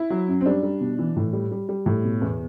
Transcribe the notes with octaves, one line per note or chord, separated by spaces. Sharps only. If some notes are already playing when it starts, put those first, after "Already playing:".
Already playing: E4
F#3
F#2
C4
G3 D4
G3
B2
E3
A2
G3
G3
G3
A2
B2
E2